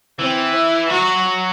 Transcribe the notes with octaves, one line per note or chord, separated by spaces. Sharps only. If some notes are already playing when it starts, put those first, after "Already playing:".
E3 C4
E4
F#3 F#4